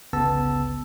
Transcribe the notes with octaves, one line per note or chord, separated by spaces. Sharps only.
G1 C#2 C#3 B3 A5 E6